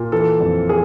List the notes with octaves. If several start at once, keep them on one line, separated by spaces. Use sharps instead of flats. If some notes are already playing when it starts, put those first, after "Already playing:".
Already playing: A#2
E3 A4
F2
G#4